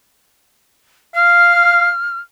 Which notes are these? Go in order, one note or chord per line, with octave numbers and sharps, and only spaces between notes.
F5 F6